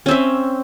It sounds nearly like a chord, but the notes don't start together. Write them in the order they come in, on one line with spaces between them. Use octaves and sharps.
C#4 C4 E5